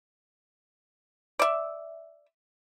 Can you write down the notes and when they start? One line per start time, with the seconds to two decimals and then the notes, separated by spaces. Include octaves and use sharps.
1.39 D5 E5